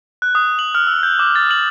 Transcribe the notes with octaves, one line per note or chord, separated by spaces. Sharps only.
F#6
D#6
F#7
F6
E6
G6
D6
A6
F#7